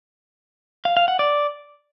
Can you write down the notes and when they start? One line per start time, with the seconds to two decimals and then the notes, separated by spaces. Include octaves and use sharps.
0.85 F5
0.97 F5
1.08 F#5
1.19 D5